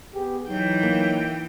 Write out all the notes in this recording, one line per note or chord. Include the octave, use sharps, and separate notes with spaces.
B3 G4 G#4
E3 F#3 D#4 G5
A#3